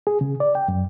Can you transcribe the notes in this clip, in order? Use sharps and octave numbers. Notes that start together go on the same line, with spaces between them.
G#4
C#3
D5
G5
F#2